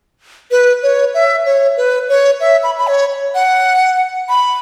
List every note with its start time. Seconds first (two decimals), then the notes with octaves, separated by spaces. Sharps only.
0.51 B4
0.83 C#5
1.14 E5
1.46 C#5
1.77 B4
2.09 C#5
2.40 E5
2.63 B5
2.79 B5
2.88 C#5
3.35 F#5
4.29 B5